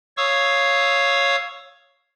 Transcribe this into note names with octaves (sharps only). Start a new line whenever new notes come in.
C#5 F5 C#6 D#6 E6